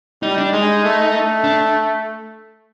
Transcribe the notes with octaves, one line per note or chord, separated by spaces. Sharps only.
G3 D#4
D4
G#3 D#4
A3
A3
D4